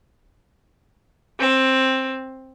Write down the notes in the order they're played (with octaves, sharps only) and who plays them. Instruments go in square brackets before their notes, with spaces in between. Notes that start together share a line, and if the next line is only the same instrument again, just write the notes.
[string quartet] C4